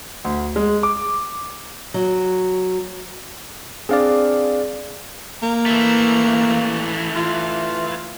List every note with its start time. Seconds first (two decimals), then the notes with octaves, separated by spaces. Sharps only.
0.24 D2
0.56 G#3
0.83 D6
1.94 F#3
3.89 C4 D4 G#4 D5 F5
5.42 A#3
5.66 E3 A3
7.16 F4